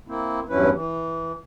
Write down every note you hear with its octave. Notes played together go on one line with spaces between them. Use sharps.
A#3 C4 E4
E2 G2 F#3 C#4 E4 B4
E3